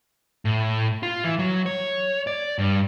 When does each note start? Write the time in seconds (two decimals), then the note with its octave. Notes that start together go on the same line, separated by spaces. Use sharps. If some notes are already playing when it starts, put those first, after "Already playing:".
0.45 A2
1.03 F4
1.24 E3
1.39 F#3
1.66 C#5
2.27 D5
2.58 G2